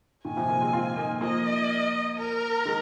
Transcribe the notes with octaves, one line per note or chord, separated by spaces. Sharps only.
A#2 D#3 G#5
C3 F3
F3 A#3
G#3 C4
C4 F4
A#3 D#4
F3 A#3 D#5
A#4
D#3 G#3